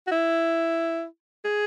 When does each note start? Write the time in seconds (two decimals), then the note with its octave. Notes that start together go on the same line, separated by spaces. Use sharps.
0.07 F#4
0.11 E4
1.45 G#4